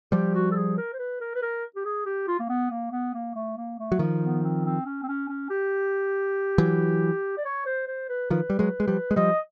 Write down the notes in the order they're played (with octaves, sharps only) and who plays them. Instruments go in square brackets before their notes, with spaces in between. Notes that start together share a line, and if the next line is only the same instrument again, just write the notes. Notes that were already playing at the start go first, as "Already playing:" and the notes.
[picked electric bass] F3 G3 [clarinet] G4
[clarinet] F#4
A4
G#4
A#4
C5
B4
A#4
B4
A#4
G4
G#4
G4
F4
A#3
B3
A#3
B3
A#3
A3
A#3
A3
[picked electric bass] F#3
D#3 F3
[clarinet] B3
C4
C4
C#4
C4
C#4
C#4
G4
[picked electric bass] E3 F#3
[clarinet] D5
C#5
C5
C5
B4
[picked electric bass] D#3 F3 [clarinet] B4
[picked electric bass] G3
F#3 G#3
G#3
F3 G3
G#3
[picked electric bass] F3 G3 [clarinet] D#5